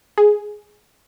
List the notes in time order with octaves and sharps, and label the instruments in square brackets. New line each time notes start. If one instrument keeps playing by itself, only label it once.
[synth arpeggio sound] G#4